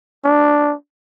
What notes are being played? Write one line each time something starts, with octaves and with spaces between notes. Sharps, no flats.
D4